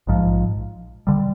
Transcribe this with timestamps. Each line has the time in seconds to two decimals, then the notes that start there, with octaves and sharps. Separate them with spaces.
0.07 A#1 G#2 F3
1.07 D3 G3